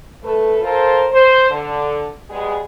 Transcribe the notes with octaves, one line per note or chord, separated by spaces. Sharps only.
A3 A4 B4
F4 A4 A#4 C5
C5
D3
G3 G#3 B3 G#4